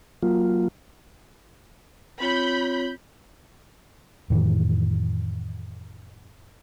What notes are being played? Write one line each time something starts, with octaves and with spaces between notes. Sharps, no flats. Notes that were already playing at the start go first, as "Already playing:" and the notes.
F#3 A#3 F4
C4 F4 C#5 B5 G6
F2 A2 D#3 E3